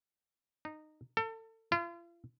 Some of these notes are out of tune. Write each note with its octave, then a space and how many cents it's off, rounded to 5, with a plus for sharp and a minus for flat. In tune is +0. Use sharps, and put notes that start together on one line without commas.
D#4 -15
A4 +30
F4 -40